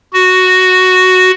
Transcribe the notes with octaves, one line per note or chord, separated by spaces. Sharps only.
F#4